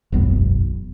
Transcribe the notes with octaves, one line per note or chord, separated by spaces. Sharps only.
E1 B1 F#2 B3